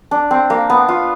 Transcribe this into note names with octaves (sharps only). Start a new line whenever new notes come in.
D4
C4
A#3
B3
F4